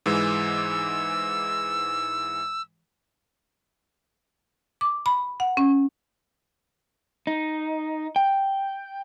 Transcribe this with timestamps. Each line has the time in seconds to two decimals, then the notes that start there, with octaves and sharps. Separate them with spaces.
0.06 G#2 E3 G#3 E6
4.81 D6
5.06 B5
5.40 F#5
5.57 C#4
7.27 D#4
8.16 G5